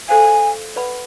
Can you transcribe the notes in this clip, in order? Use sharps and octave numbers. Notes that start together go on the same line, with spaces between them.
A4 C5 F5 G#5
B4 D5 F#5 B5